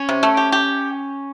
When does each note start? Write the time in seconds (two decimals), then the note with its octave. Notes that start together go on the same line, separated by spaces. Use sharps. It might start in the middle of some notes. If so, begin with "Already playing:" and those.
Already playing: C#4
0.09 C3
0.23 A3
0.37 G4
0.52 G4